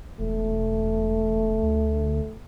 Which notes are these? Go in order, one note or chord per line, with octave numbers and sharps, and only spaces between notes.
E1 A3
D2